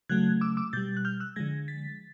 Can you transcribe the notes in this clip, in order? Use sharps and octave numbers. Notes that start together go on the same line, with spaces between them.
C#3 F#3 A3 F#6 G#6
D6 E6
D6 E6
B2 G3 G6 A6
F#6
F6 G6
E6 F#6
D3 F3 G#3 G#6 A#6
A6 B6